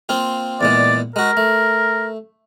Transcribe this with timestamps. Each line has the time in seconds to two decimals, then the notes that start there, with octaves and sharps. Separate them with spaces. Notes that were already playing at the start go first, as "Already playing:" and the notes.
0.09 A#3 C4 F4
0.61 E2 A#2 G#3 D5
1.16 G#3 F#4 A#4
1.37 A3